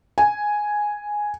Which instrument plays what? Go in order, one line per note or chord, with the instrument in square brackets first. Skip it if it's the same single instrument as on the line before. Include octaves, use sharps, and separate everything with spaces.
[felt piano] G#5